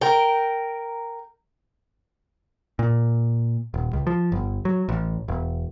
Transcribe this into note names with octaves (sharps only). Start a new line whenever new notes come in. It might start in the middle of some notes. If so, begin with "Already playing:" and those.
A#4 G5
A#2
D#1
C#2
F3
G1
F#3
A1
E1